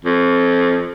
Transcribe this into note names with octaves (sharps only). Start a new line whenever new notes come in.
F2